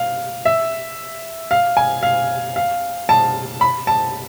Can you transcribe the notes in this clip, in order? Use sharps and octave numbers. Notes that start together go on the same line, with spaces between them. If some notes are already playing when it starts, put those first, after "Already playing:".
Already playing: F5
E5
F5
G#5
F5
F5
A5
B5
A5